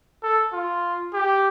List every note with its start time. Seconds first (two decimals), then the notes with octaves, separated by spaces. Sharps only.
0.23 A4
0.53 F4
1.14 G4